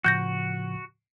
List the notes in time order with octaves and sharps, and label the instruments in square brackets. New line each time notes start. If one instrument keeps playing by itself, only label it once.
[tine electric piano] A2 C#3 F3 [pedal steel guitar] F#4 [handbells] F#6 G6 A#6